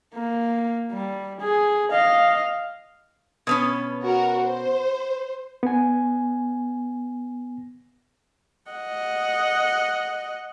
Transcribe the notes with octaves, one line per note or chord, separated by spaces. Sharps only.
A#3
G3
G#4
D#5 F5
B2 B3 C#4
F#4 A#4
C5
B3 G#5
D#5 F#5